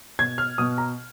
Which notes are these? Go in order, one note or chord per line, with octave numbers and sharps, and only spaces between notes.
B2 G#6
F6
B2 D#6
A#5